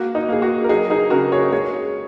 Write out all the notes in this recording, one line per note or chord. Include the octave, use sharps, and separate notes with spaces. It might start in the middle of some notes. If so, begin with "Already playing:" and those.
Already playing: G#3 A#3 F#4
D#4
A#3 G#4
F#4
A#4
F#3 D#4 G#4
D#4 G#4
C#3 F#4 A#4
G#4 C#5
G#3 G#4 C#5